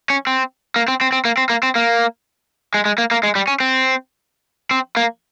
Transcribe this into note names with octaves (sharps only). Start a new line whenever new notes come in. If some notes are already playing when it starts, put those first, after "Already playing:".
C#4
C4
A#3
C4
C4
C4
A#3
C4
A#3
C4
A#3
G#3
G#3
A#3
A#3
G#3
G3
C#4
C4
C4
A#3